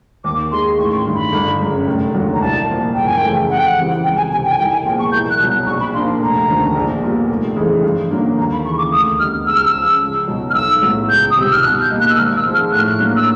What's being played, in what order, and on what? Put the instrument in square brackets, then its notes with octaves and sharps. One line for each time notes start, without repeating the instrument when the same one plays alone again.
[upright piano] D#2 [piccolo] D6
[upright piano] D#3 G#3 [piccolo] C6
[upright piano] A1 [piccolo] C#6
[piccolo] C6
[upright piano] G2 D#3
[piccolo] B5
[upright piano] G1
F#2 C#3
F1
D#2 D3 F#3
[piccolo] A#5
[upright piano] C2 [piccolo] A5
[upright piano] A#2 F3
[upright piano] F#1 [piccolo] G5
[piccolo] G#5
G5
[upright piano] E2 C#3 F3 A3
[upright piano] F2 [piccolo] F#5
[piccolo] G5
F#5
[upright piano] C#3 E3 G3 C4
[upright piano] C#2 [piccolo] G5
[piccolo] G#5
[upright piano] C3 D#3 [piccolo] G#5
[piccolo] G5
G#5
[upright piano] C2 [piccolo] G5
[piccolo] G#5
[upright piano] A#2 F3 G#3 B3 [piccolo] G5
[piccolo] C#6
[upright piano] C2 [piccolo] G6
[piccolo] F#6
[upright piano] B2 F#3
[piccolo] F#6
[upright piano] A#1 [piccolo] C#6
[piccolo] B5
[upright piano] A#2 F3 A#3 D4 [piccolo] C6
[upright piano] F1 [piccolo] A#5
[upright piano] D#2 D3 F3
A#1
A#2 G3 B3
F1
F2 C#3 E3 G#3
G2
D3 F#3 A#3 D4
[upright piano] D#2 [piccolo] A#5
[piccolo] B5
[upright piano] C#3 E3 [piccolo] C#6
[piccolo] D6
[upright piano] D2 [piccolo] D#6
[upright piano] D3 G3 B3 D#4 [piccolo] F6
[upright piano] C#2 [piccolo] E6
[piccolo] F6
E6
[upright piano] C#3 F3
C#2
B2 F#3 B3 D#4
[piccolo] F6
[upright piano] B1 [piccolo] E6
[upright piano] A2 F#3 B3
[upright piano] C#2 [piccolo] G6
[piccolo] D#6
[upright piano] C3 D#3 G3 [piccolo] E6
[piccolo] F6
[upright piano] B2 [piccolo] F#6
[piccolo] G6
[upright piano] G3 A#3 D#4
[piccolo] F#6
E6
[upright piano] G#1 [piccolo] F6
[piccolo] E6
[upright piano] G#2 F3 G#3
[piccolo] F6
[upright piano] A2 [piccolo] F#6
[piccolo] F6
F#6
[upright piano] F#3 A#3 D4
[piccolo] E6